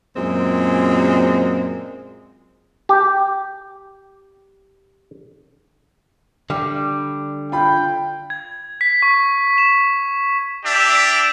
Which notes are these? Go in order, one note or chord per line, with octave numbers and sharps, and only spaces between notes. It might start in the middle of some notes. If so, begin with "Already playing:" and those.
F#2 A#2 G#3 C4
G4 G5
D3 G3
F4 G5 B5
G#6
B6
C#6
E7
D4 G4 D5 E5